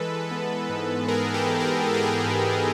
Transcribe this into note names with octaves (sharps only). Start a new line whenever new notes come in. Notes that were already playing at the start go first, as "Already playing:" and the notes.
Already playing: E3 G#3 A4 B4
B3
G#2
G#3 G#4 A#4
G4 A4
E3
G#4 A#4
B3 A4
G#4
G4 A4
G#2